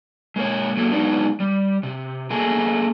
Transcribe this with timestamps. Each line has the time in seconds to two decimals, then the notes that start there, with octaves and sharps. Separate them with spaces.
0.36 G#3 A#3 A#4 C#5
0.77 F#3 A#3 A4
0.91 F#3 G#3 B3 D4 D#4
1.40 G3
1.83 C3
2.30 A3 A#3 G#4 A#4